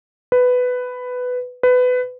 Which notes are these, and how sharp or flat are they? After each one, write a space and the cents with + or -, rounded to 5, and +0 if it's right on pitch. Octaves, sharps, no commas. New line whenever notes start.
B4 +10
B4 +20